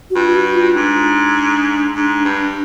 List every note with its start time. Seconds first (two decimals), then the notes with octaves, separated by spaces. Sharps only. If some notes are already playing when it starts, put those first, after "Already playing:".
0.10 F#4
0.15 G2 F4
0.35 F#4
0.55 F4
0.75 G#2 D4
1.95 G#2
2.25 G2